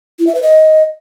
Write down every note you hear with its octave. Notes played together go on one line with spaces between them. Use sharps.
E4
E5
B4
D#5